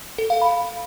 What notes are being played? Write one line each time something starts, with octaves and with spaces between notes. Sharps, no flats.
A4
F5
B5